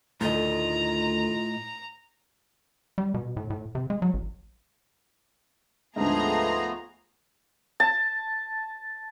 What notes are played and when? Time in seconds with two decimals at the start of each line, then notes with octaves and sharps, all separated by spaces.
0.21 D2 A2 D#3 F4 D#5 A#5
2.98 G3
3.14 B2
3.37 A2
3.50 A2
3.75 C3
3.90 G#3
4.02 F#3
4.14 A1
5.96 D2 G#2 F3 A3 B3 G#4 A#5 C6
7.80 A5